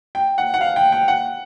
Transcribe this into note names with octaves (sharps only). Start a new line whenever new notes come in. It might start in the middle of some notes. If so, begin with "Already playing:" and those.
G5
F#5
F#5
F5
G5
G5
F#5